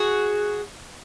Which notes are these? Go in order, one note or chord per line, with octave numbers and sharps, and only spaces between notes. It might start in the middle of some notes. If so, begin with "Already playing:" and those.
Already playing: F#4 G#4